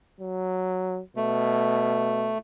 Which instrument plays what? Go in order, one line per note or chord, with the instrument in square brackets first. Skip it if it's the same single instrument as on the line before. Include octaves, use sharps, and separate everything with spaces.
[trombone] F#3
[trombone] B2 [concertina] A3